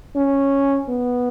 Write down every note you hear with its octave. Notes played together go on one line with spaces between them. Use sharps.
C#4
B3